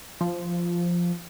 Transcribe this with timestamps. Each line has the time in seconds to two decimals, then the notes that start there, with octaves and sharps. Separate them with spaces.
0.21 F3